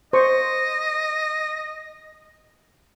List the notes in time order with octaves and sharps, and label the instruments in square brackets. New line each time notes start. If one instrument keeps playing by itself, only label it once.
[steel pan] C5 C#6 [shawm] D#5